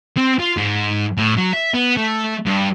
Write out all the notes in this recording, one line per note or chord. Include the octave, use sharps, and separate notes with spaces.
C4
F4
G#2
A2
F#3
E5
B3
A3
G2